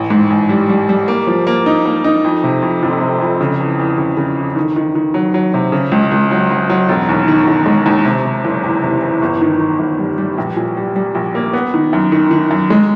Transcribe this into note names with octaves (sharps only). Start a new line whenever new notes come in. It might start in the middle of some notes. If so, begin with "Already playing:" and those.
Already playing: A1
G#2
A1
G3
G3
G3
A#3
F3
A#3
D#4
A#3
D#4
F2
C3
F2
F1
C3
F2
C#3
E2
E2
C#3
C#3
E3
D#3
D#3
D#3
F#3
F#3
C3
C#3
C#2
C#2
F#3
F#3
F#3
E1
D#2
D#3
E1
G#3
D#2
C3
C3
F#1
E2
C3
E2
G1
D#3
D#3
G1
G3
G3
A#1
A#2
G3
G3
A#1
A#3
B3
D#3
F#2
D#3
D#3
F#2
G#3